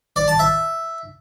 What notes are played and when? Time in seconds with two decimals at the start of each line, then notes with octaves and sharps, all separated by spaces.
0.16 D5
0.28 A5
0.39 E5